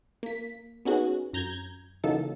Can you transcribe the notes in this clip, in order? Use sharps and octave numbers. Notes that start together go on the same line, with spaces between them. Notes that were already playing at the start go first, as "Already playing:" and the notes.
A#3 B6
B3 C#4 D#4 F#4 G#4
F#2 A#5 G6 G#6
C#3 E3 F#3 A#3 D#4 A4